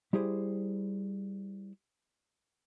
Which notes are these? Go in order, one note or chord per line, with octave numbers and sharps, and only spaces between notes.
G3 E4 G4 G#4 C5